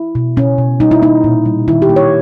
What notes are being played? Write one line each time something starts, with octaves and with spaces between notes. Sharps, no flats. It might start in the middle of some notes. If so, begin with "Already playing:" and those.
Already playing: E4
B2
B2 C#4
B2
G3 D#4
E4
A#3 D#4
A#2
G3
D#3 E4
G4
A#3
C#5